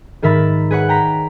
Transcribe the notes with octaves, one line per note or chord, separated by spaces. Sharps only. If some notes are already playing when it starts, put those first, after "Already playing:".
G#2 D#3 A#4 E5 B5 A6
G#4 B4 C#5 F#5
G5 A#5 B6